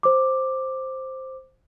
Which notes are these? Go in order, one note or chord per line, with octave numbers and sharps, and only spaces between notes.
C5 D6